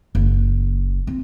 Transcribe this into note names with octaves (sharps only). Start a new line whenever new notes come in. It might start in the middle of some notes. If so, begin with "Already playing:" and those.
F#1
C4